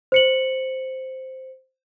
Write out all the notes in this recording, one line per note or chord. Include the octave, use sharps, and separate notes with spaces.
C5 C#7 F#7